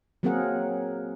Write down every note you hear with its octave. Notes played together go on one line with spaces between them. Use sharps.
F#3 A#3 C4 G#4 A#4 F#5